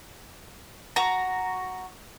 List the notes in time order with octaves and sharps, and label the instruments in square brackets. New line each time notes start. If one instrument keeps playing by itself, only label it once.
[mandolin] F#4 A#5